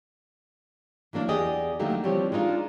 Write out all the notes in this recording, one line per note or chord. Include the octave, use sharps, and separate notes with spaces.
E3 F#3 A#3 D4
E2 G4 G#4 D5 D#5
D3 F#3 A3 A#3 D#4 G4
E3 F3 G3 C4 G4 C#5
G#3 D4 D#4 F4 A#4